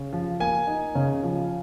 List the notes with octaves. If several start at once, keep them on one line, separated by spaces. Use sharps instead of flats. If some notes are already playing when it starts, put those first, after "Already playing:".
Already playing: C#3
F3
A#3 G#5
D#4
C#3
F3